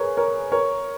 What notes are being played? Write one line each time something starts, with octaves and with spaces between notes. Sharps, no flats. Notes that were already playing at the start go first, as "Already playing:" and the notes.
Already playing: G#4 A#4 B4 C#5
A#4 C#5
A#4 C#5